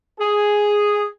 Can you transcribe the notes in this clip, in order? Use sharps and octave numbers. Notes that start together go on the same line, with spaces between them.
G#4